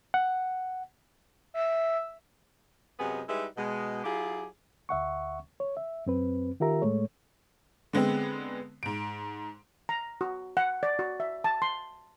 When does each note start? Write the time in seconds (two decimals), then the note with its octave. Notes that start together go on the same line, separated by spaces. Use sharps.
0.14 F#5
1.54 E5
2.99 F#2 C3 G#3 B3 G#4 D#5
3.28 G3 G#3 D#4 E4 B4 E5
3.57 B2 G#3
4.04 F#3 E4 F4 G4 G#4
4.89 D2 E5 F#5 C#6
5.60 C#5
5.77 E5
6.06 F#2 C4 B4
6.60 D#3 F4 G4 A#4 E5 A#5
6.82 A2 G#3 A3 C#5
7.93 D3 G#3 B3 C4
8.83 G#2 D7
9.89 A#5
10.21 F#4
10.57 F#5
10.83 D5
10.99 F#4
11.20 E5
11.44 A5
11.62 C6